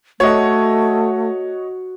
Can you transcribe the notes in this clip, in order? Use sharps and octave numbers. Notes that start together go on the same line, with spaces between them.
A3 F#4 C#5 D#5 F#5